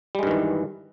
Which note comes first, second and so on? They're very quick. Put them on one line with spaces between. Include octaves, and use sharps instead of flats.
G3 G#3 G2 D#3 E3